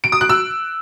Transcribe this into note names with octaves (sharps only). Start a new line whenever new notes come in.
D7
D#6
F#6
E6